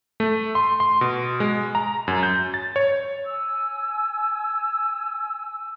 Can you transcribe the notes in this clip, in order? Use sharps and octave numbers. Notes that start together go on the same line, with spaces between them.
A3
C6
C6
B2
G#3
A#5
F#2
G6
A6
C#5
G#5 E6